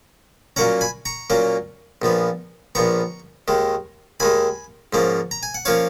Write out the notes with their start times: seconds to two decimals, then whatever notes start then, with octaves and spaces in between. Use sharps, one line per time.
0.56 A#2 F#3 A#3 C#4 F#5 A#5
0.81 G#5 B5
1.05 A#5 C#6
1.30 A#2 F#3 A#3 C#4
2.02 A#1 A#2 F3 B3
2.75 A#1 A#2 F3 B3 A#5 C#6
3.48 D#2 D#3 G#3
4.20 D#2 D#3 G#3 G#5 B5
4.93 G#2 F3 A#3 C#4
5.31 A#5
5.43 G#5
5.55 F#5
5.65 F3 A#3 C#4 C#5 F5